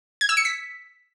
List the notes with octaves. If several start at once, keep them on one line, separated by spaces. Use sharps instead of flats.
G#6
E6
C#7
B6